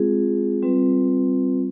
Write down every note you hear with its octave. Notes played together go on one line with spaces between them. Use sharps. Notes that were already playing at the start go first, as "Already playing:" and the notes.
Already playing: G#3 C4 F4 G#4
G3 C4 F4 B4